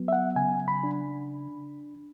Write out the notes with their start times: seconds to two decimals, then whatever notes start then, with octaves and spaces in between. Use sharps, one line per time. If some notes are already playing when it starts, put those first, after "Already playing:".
Already playing: F#3 B3
0.08 E5
0.13 F#5
0.36 C#3 G#5
0.68 B5
0.84 D4